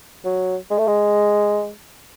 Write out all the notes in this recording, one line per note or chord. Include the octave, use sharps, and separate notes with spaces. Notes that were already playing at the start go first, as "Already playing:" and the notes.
F#3
G#3
A3
G#3